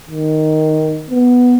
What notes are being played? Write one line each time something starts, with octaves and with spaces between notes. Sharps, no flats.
D#3
B3